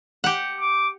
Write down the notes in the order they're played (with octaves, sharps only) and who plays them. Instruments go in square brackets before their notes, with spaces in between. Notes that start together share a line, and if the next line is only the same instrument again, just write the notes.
[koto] G4 F#5
[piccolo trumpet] D6